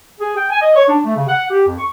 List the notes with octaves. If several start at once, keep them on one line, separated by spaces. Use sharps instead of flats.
G#4
G5
G#5
D#5
C#5
D4
A3
C#3
F#5
G4
F2
C#6